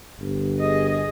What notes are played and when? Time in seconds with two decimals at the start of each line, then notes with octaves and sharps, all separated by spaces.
0.20 G1
0.59 G#4 D#5